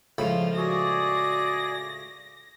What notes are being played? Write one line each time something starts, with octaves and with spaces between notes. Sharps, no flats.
C#2 A2 F3 F4 B5
F#4 G#4 D5 A#6